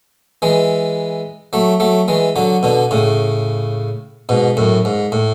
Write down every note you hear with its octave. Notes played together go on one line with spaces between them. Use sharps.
E3 G#3
F#3 A3
F#3 A3
E3 G#3
D3 F#3
B2 D3
A2 C#3
G#2 B2
F#2 A2
G#2
A2